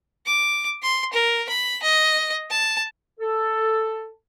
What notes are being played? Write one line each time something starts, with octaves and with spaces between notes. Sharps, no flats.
D6
C6
A#4
B5
D#5
A5
A4